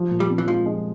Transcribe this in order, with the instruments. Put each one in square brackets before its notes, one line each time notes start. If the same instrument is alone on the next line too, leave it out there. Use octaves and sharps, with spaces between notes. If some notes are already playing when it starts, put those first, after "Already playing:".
Already playing: [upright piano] F3
A#2
[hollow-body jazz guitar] G3
[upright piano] C4
[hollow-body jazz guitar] E3
[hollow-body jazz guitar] F3 [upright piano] G#3
[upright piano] G#3